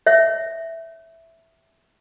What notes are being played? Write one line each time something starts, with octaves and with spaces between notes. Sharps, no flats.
C#5 E5